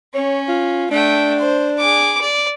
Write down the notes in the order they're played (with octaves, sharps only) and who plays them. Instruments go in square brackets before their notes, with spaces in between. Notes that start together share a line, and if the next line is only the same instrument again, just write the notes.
[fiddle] C#4 [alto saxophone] C#5
[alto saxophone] F4
[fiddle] A3 G5 [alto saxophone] D4
[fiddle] C5
G#4 D6
D5